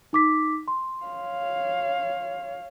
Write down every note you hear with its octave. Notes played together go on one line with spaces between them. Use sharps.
D#4 D6 B6
C6
C#5 F5